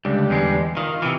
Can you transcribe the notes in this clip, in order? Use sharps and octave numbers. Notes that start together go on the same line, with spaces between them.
C#2 D3 G3
E2 G#3
D#3 F4
C3 E3